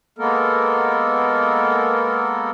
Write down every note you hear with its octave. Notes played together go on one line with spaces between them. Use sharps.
G#3 A#3 B3 A4 A#4